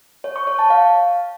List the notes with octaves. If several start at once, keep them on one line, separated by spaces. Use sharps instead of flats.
C#5
C#6
C#5
A5
F5